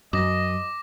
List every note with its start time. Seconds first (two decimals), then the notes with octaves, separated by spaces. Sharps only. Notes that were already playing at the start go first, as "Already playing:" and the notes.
0.13 F#2 D#5 D6 A#6